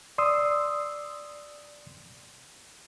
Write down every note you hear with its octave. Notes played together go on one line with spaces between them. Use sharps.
D5 C6 D#6 E6